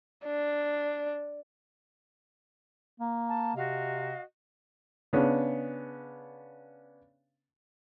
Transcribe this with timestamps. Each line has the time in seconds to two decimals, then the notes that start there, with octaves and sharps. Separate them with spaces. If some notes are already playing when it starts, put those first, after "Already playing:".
0.25 D4
3.00 A#3
3.29 A5
3.56 C3 F#4 D#5 F5
5.13 C#3 B3 C#4 D4